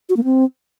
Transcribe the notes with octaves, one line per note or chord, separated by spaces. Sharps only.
F#4
A#3
C4